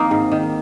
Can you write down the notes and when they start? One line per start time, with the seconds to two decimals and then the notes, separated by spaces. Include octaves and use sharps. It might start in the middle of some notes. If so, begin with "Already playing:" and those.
Already playing: D#3 A#3 C4 D#4
0.11 G#2
0.32 D#3